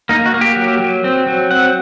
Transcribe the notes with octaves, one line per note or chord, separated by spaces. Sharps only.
A#3 D#4
F#4
A#3
G4
F#3
F#3
C4
F#3
C4 F#5